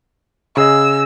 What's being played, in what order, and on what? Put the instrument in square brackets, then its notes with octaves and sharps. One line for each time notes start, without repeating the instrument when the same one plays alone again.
[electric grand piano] C#3 G#4 D#5 [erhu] E6